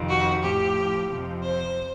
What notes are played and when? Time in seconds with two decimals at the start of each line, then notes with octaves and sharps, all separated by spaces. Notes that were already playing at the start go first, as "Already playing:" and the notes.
Already playing: F2 C3 D#3
0.09 F#4
0.42 A2 F3 G4
1.08 F2 C3 F3
1.42 C5